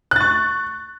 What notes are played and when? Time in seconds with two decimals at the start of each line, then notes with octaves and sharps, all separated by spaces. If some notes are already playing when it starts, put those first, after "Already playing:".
0.11 F#6
0.16 A6
0.21 C#6